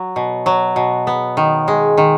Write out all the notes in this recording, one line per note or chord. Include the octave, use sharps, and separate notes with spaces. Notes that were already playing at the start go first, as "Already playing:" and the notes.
Already playing: F#3
B2
F#3
B2
B3
D#3
G#3
D#3